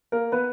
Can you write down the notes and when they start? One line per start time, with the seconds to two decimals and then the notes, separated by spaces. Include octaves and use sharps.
0.12 A#3 A#4
0.32 B3 B4